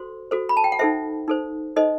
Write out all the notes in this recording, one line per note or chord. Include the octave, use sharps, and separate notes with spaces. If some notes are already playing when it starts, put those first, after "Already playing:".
Already playing: F#4 A4 C5 C6
F#4 A4 C5
B5
A5
G5
F#5
D#4 A4 C5 E5
D#4 A4 C5
D#4 A4 C5 D#5